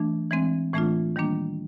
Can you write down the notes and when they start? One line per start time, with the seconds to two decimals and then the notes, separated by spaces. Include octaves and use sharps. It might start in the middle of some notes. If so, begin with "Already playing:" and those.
Already playing: E3 A3 D4
0.31 E3 G#3 C4
0.73 A2 E3 A3 D4 F4
1.16 D#3 G3 A#3 D4